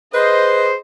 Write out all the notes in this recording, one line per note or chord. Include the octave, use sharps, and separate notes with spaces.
G#4 B4 C5 D#5